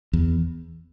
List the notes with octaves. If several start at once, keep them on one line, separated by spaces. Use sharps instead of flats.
E2